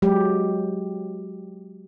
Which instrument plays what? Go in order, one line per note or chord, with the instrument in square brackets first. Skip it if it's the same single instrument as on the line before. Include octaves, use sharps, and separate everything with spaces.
[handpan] F#3 G#3 G4